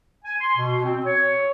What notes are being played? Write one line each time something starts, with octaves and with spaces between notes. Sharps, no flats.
G#5
C6
B2
C4
C#5